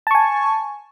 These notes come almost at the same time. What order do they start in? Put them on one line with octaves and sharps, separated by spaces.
A5 C#6 G#5